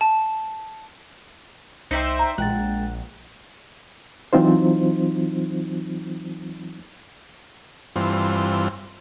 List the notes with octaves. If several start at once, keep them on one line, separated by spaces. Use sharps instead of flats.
A5
C2 D#4 C5 D5 E5 G5 C6 C#7
A#5
A#1 G#3 F#5 G5 A6
E3 F#3 C4 D#4 F4 C5
G2 E3 C4 F4